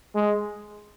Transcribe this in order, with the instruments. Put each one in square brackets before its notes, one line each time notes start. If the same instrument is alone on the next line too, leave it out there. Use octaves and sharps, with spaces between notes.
[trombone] G#3